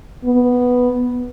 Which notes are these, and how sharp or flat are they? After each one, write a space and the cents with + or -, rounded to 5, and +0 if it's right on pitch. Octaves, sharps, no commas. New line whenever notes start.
B3 +0